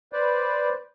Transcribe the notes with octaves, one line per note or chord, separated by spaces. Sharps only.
B4 C5 D5